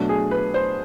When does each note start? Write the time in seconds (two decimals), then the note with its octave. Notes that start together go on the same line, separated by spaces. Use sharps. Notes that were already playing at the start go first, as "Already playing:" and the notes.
Already playing: B2 F#3 A3 D4
0.09 G#4
0.31 B4
0.54 C5